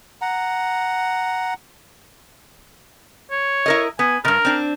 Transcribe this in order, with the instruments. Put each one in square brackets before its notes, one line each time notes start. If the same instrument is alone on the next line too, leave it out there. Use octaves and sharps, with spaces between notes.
[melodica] F#5 A#5
[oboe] C#5
[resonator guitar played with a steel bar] E4 A#4 D#5
[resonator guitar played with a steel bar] B3 [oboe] G#5
[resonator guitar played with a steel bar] G2 B2 [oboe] A#4
[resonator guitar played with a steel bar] C4 D4